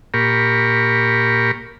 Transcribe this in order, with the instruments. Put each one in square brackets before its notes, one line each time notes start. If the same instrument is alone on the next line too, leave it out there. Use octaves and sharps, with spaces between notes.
[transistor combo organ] A#2 G4 A#4 B5 C#6